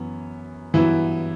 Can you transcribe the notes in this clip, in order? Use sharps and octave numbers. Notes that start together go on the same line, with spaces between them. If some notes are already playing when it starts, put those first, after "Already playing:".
Already playing: F#2 E3 B3
G2 E3 F#3 B3 E4